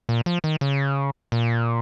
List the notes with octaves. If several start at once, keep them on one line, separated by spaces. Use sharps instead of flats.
A#2
F3
D#3
C#3
A#2